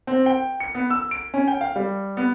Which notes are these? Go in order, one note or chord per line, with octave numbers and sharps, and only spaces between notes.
C4
G5
C#7
B3
E6
D7
C#4
G5
F5
G3
B3